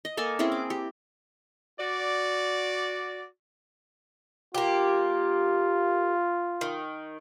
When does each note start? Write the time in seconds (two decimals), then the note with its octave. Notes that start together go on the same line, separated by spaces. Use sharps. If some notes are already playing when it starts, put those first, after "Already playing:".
0.05 D#5
0.17 A#3 A4 G#5
0.39 C4 C#4 E4 G#4
0.52 D6
0.70 G4
1.79 F#4 D5
4.55 A#3 F4 G4
6.61 D#3